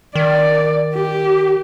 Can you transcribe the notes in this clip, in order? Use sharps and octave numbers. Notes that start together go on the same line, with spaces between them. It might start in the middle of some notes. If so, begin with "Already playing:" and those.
D#3 D5
G4